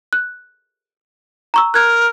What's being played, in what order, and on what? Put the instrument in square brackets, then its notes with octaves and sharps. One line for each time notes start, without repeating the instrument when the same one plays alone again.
[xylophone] F#6
A#5 C#6 E6
[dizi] A#4 [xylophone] F#6 G#6